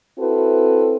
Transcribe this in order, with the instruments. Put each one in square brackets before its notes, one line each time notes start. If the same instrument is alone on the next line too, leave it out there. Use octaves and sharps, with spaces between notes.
[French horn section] C4 E4 F#4 A4 B4